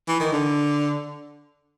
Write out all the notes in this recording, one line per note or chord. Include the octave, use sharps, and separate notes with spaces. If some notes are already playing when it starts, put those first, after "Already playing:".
E3
D#3
D3